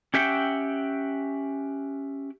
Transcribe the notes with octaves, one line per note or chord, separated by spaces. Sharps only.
C#4 G4 E5 F#5 G5